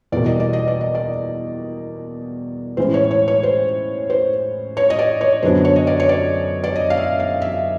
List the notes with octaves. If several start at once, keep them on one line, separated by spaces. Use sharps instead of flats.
E2 B2 G3 A#3 D5
D#5
D5
D#5
D5
D#5
D5
A2 E3 G#3 C#4 C5
C#5
C#5
C#5
C5
C5
C#5
D#5
D5
C#5
F#2 D3 F#3 B3 D4 C5
C#5
D#5
D5
C#5
D5
D5
D#5
F5
E5
F5
E5